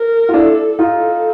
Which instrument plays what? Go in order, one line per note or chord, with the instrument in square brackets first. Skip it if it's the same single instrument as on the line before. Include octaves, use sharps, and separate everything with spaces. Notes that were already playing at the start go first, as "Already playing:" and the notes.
Already playing: [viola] A#4
[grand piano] F4
[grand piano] D4 E4 [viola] A4
[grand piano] D#4 F4 [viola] A4